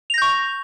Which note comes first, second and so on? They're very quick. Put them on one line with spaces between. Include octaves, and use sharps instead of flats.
F7 A#6 G6 C#6